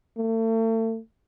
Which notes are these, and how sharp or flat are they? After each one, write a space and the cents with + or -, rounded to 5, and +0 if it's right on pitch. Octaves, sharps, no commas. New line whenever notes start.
A3 +35